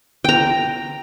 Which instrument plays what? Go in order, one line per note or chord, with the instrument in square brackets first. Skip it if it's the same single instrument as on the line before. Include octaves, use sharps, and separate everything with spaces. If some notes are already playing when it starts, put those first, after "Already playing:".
[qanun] G5 A#5